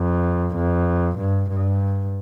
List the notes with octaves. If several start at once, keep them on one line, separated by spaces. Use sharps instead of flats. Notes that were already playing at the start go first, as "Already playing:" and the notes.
Already playing: F2
F2
G2
G2